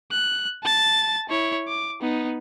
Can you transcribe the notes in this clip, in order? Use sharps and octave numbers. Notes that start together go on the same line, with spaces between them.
F#6
A5 A6
E4 C#5
D6
B3 D#4